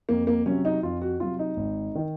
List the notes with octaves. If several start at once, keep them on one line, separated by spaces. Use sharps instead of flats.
F2 A#3
A#3
C3 F#3 C#4
D#4
F2 F4
F#4
C3 F#3 F4
D#4
G#1
D#3